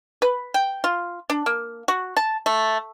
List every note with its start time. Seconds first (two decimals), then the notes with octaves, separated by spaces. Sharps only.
0.22 B4
0.54 G5
0.84 F4
1.30 D4
1.46 A#3
1.88 F#4
2.17 A5
2.46 A3